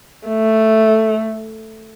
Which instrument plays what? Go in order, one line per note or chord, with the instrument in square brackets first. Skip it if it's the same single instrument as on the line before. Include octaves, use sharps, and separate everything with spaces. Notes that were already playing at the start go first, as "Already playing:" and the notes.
[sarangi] A3